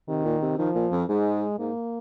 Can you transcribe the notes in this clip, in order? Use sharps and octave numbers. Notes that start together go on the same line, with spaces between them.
C3 D#3
A#2
C3
D#3 F3
A#2
F2
G#2 G#3
G#2 A#3